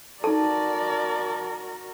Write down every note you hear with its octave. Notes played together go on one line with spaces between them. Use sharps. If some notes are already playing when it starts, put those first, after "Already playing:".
D#4 F#4 A4 A#4 D5 A5